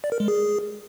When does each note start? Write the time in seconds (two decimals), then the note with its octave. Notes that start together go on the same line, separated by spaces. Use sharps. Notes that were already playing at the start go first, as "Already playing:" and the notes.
0.04 D5
0.12 A#4
0.20 G#3
0.28 G#4